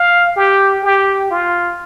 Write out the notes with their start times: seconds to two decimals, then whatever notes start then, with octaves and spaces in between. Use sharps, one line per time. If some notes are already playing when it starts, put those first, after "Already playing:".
Already playing: F5
0.36 G4
0.83 G4
1.31 F4